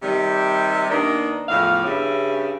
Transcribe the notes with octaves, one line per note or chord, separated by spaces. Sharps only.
C3 D#3 G3
D#3 A#3 B3 D4
E2 A2 F3 F5
G2 C#3 E5